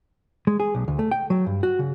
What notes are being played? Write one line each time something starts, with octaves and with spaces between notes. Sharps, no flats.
G#3
G#4
B1
D2
A3
G5
F#3
G2
F#4
C#3